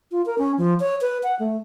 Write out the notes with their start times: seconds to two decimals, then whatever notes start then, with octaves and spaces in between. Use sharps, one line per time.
0.12 F4
0.26 A#4
0.38 C#4
0.58 F3
0.80 C#5
1.01 B4
1.23 F#5
1.39 A3